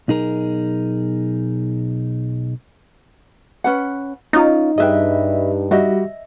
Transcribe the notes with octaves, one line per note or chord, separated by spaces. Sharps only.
B1 D#4 G#4 A#4
C#4 B4 F#5
C#4 D#4 F4
G2 G#4 B4 D#5 E5 G5
G3 F#4 G4 D#5 E5